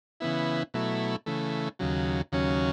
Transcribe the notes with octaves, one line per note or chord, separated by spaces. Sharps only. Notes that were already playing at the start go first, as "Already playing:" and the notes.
C#3 E3 B3 E4
B2 F#3 A3 E4
C#3 E3 A3
D#2 C#3 F#3
D#2 C#3 F#3 C#4